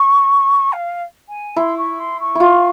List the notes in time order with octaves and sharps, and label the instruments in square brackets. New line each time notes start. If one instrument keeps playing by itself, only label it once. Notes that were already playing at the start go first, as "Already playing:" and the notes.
Already playing: [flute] C#6
F5
G#5
[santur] E4 [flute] C6
[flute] C#6
C6
C#6
[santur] E4 F4